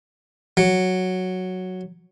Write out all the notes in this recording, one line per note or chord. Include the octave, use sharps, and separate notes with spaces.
F#3